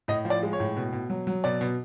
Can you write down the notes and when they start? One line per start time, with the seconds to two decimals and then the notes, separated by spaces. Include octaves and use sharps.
0.08 A2 D#5
0.25 F3
0.30 D5
0.43 G#3
0.53 C#5
0.60 A2
0.77 B2
0.93 B2
1.10 F#3
1.27 F#3
1.44 B2 D5
1.61 B2